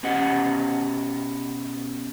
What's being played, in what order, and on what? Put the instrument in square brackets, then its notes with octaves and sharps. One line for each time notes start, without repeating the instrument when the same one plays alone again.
[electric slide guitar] B2 C#4 G4 D#5 F#5